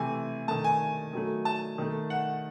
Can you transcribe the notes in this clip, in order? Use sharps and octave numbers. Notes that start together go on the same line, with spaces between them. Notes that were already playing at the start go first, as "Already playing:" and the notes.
Already playing: C3 E3 A3 G#5
D#3 A3 A5
G#5
D#3 F#3 A3
A5
D#3 A3
F#5